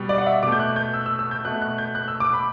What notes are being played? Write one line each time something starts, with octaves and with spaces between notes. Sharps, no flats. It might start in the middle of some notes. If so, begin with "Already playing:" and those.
Already playing: B2 G3
D5
F#5
E5
B2 A3 D6
G6
F#6
G6
E6
E6
E6
G6
B2 A3 F#6
F#6
G6
F#6
E6
D6
B5